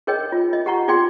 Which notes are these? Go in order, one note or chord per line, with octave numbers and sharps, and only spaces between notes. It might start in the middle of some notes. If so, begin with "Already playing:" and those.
G#4 A#4 C#5 D#5 G5
F4
D#5
G4 F#5 A#5 C#6
F4 G#4 D5 G5 C6